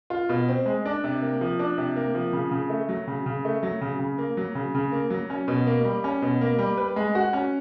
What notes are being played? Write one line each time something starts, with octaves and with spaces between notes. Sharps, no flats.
F4
B2
C4
G#3
D4
C3
A#3
F3
D4
C3
A#3
F3
C#3
C#3
A3
F#3
C#3
C#3
A3
F#3
C#3
C#3
A#3
F#3
C#3
C#3
A#3
F#3
C#4
B2
A#3
G3
C#4
B2
A#3
G3
B4
G#3
F#4
C#4